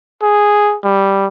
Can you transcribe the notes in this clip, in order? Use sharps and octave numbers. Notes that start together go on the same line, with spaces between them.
G#4
G3